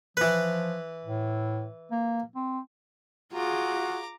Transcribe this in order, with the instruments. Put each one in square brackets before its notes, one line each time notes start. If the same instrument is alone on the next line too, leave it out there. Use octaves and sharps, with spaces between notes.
[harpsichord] E3 B4 [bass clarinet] F3
[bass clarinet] A2
A#3
C4
[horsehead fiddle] F4 G#4 [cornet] F#4 [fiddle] A#5 D6